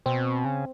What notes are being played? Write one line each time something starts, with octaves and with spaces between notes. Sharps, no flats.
B2 C4
C#3